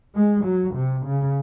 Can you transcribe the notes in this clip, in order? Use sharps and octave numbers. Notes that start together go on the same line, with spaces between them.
G#3
F#3
C3
C#3